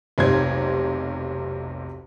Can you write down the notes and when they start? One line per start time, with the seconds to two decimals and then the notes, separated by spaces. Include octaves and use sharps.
0.18 F1 B1 C3 D#4 C5 G#6